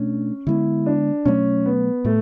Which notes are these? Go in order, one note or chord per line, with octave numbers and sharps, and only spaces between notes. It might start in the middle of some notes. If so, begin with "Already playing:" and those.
Already playing: B2 A3 C#4 D4
D3 G#3 B3 E4
D4
B2 F#3 A3 C#4
B3
A2 A3